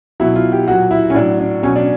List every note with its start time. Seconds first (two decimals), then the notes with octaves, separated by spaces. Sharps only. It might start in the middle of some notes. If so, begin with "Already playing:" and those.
0.20 B2 F#3 E4
0.36 F4
0.52 G4
0.67 A#2 F#3 F#4
0.91 E4
1.10 C#4
1.15 A2 F#3 D4
1.40 D4
1.62 B2 F#3 C#4
1.76 D4